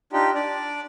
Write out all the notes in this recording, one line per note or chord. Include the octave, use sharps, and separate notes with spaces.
D4 D#4 F4 G4
D4 D5